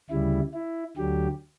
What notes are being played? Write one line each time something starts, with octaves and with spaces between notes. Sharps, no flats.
D2 C#3 G3 E4
E4
D2 D3 F#3 G4